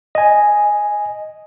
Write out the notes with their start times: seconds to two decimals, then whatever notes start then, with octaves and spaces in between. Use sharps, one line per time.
0.15 D#5 G#5